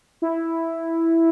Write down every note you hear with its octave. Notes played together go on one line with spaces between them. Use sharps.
E4